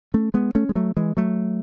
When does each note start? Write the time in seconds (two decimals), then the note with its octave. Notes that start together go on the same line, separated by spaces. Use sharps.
0.14 A3 C#4
0.34 G#3 B3
0.55 A3 C#4
0.69 G#3
0.75 F#3 A3
0.97 E3 G#3
1.17 F#3 A3